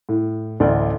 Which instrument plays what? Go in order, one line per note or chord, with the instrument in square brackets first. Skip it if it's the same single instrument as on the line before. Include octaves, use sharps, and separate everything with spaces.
[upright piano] A2
A1 D2 D5